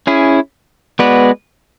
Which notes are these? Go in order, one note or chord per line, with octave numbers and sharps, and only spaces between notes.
C#4 E4 G#4
G#3 B3 F#4 B4 D5